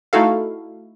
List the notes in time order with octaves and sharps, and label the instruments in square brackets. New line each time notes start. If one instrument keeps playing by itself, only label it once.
[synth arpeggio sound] A3 D#4 E4 F#4 A4 F5